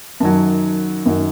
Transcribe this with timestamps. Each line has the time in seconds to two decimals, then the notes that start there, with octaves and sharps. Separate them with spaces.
0.20 F#2 D#3 F#3 A5
1.06 F#2 D#3 F#3